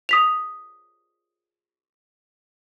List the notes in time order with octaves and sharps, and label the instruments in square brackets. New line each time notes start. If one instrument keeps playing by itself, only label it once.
[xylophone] D#6 B6 F7